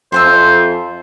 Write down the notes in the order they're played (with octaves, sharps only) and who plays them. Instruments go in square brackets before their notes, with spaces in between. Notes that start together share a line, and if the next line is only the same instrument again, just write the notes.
[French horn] F2 [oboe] C5 [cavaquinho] E5 G#5 C6